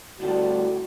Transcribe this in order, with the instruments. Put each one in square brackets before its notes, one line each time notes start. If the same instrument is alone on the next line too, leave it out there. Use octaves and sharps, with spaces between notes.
[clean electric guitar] D2 A2 G3 [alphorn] F#4